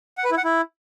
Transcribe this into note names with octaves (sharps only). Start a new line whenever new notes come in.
F#5
B4
E4
F#5
E4